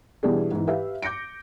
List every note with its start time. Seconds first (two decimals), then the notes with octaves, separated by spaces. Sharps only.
0.23 B2 E3 G3 D4 G#4
0.51 G#2 E3
0.67 G4 B4 E5 F5
1.02 D6 G6 A#6 C#7 D7